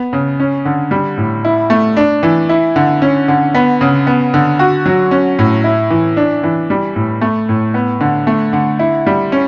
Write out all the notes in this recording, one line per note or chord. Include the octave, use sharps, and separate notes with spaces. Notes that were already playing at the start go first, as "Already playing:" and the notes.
Already playing: B3
C#3
C#4
D3
G3
A2
E4
A3
D4
E3
E4
D3
C#4
D3
B3
C#3
B3
D3
F#4
F#3
C#4
A2
E4
E3
D4
E3
G3
A2
A3
A2
B3
D3
A3
D3
E4
G3
C#4